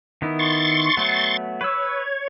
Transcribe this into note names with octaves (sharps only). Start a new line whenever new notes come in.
D#3 B3 E4
C6 C#6 A6
F#3 A3 B3
B4 C#5 E6